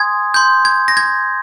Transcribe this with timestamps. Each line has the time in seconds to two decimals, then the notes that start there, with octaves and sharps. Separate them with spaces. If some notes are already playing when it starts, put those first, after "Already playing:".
Already playing: G#5 C6 D#6 G#6
0.34 C6 G6
0.65 G#6
0.88 A#6
0.97 G#6